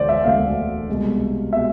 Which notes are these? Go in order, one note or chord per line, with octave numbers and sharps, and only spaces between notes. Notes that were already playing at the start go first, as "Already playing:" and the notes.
Already playing: E1 D2 D3 A3 C5 D5
E5
E1 D2 D3 A3 F5
C2 B2 G#3
B2 G#3 E5